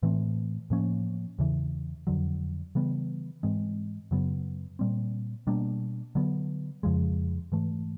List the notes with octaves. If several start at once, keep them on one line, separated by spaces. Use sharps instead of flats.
A2 E3 A3 C4
A2 F3 A#3 C#4
E2 C#3 E3
F2 D3 F#3
C#3 E3 G3 B3
G#2 E3 G#3 C4
F#2 C#3 F#3 B3
A#2 G3 C4
B2 G3 A#3 D4
D3 F#3 B3
F2 C#3 F3 G#3
G#2 E3 A3